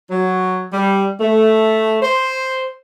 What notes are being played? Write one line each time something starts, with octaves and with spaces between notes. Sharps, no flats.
F#3
G3
A3
C5